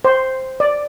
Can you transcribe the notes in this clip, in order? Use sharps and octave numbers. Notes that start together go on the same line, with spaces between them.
C5
D5